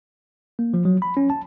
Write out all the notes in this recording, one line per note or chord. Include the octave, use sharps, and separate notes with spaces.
A#3
F3
F#3
B5
C#4
A5